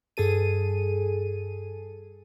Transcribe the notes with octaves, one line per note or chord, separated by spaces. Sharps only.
G2 G#4 A4 D#7